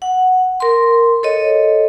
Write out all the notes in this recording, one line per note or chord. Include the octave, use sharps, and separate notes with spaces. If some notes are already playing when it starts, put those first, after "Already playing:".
F#5
A#4 C6
A4 C#5 D#5